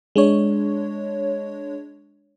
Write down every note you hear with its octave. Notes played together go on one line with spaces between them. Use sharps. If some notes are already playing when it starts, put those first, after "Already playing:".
G#3 D4 C#5